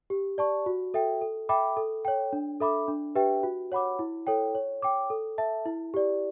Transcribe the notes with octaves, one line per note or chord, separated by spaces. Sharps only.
G4
D5 A5 C#6
F#4
A4 E5 G5
A4
E5 G5 B5 D6
A4
C#5 G5
D4
A4 E5 B5 D6
D4
G4 B4 E5 G5
F#4
C#5 F#5 B5 D6
E4
A4 C#5 G5
C#5
G5 D6
A4
E5 A5
E4
G4 D5